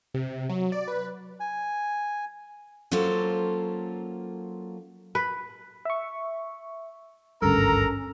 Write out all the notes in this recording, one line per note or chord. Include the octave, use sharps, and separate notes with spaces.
C3
F#3
D5
B4
G#5
F#3 A#3 C#4 F4 A4 C5
B4
E5 C#6
G#1 D2 G2 C#4 A4 A#4 A#5